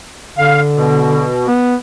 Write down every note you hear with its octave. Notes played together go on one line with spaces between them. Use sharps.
D3 F5
B2
B3